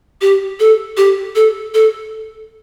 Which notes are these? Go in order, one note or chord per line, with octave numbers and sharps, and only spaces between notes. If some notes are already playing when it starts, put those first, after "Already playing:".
G4
A4
G4
A4
A4